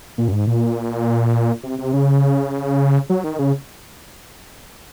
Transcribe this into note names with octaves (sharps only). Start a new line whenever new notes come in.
A#2
F#2
G#2
A#2
C3
C3
C#3
F#3
D#3
C#3